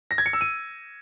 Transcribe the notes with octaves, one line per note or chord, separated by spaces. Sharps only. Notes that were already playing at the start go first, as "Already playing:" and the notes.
A#6
G#6
C#7
E6
D#7